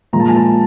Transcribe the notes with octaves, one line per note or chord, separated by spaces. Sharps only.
A#2 F3 G#3 A#5
A5
G#5
A5